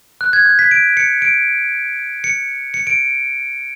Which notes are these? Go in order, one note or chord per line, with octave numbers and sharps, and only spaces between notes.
F#6
G#6
G6
B6
D7
C#7
D7
C#7
C#7
D7